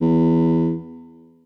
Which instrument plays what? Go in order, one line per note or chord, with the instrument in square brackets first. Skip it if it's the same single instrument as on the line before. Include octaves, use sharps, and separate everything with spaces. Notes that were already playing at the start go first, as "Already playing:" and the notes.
[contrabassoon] E2